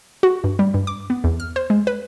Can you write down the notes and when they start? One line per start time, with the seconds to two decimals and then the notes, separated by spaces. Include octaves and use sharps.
0.23 F#4
0.44 G2
0.59 G3
0.74 G2
0.87 D6
1.10 B3
1.24 E2
1.40 F6
1.56 C5
1.70 G#3
1.87 B4